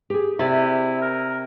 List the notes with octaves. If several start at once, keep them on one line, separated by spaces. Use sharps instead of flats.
G4 G#4
C3 E4 D5 E5
A#4